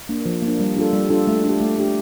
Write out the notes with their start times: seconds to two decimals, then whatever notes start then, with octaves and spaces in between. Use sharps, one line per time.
0.09 A#3 D4
0.26 F3
0.42 A#3 D4
0.60 G3
0.77 D4 F4 A4
0.93 G3
1.10 D4 F4 A4
1.27 A3
1.44 D4 G4
1.61 A3
1.78 D4 G4